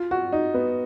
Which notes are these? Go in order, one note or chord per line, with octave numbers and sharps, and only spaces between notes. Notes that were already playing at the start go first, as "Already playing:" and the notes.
Already playing: F4
F#4
D#4
B3